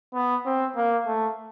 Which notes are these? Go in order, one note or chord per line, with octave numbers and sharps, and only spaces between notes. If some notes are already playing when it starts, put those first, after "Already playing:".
B3
C4
A#3
A3